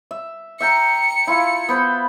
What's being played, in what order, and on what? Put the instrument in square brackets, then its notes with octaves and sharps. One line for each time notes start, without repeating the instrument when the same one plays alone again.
[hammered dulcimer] E5
[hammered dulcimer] E5 G5 A#5 [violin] C#7
[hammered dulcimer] E4 F4 F5
B3 C5 B5